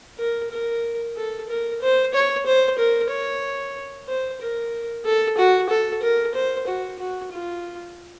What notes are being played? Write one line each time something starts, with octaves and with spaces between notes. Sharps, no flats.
A#4
A#4
A4
A#4
C5
C#5
C5
A#4
C#5
C5
A#4
A4
F#4
A4
A#4
C5
F#4
F#4
F4